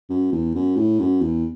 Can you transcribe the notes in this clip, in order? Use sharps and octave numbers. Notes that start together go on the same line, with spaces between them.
F#2
E2
F#2
A2
F#2
E2